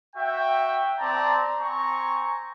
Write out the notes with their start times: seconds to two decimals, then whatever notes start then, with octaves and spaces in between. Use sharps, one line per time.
0.16 F#4 E5 G5
0.99 C4 D5 A5 A#5
1.59 C4 G#5 A#5 C#6